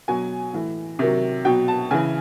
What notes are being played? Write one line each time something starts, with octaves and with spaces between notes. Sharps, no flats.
B2 F#3 G#5
A2 E3
C3 D#3 F#3
B2 F#3 G5
A5
C#3 E3 G#5